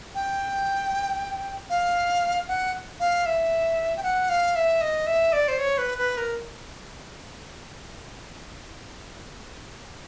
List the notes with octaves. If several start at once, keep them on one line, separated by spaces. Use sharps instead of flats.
G5
F5
F#5
F5
E5
G5
F#5
F5
E5
D#5
E5
D5
C5
C#5
B4
B4
A#4